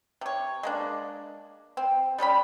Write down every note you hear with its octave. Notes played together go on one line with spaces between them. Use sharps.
C3 C#5
G#3 A#3 D4
C4
G3 G#3 C#4 B5